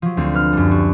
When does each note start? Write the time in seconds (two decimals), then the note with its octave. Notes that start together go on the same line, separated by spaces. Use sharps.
0.02 F3 F#3
0.17 D2 D3 C4
0.34 B4 F6
0.53 F#2 G3
0.71 F#4